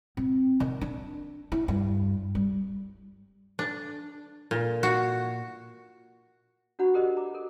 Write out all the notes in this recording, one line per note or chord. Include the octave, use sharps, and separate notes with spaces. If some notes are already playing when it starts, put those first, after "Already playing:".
C4
D#3
D4
E4
G2
G3
D4
A#2
F#4
D4 F#4 C#5 F#5 A#5 B5
G4 A4 A#4 C5 D5 D#5
A#5 D6
A4 A#4